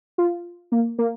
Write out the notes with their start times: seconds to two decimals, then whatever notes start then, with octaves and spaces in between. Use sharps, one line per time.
0.18 F4
0.72 A#3
0.98 A#3